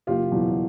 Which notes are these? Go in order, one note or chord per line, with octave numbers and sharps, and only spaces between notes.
F#1 F4 G4
E2 B2 F#3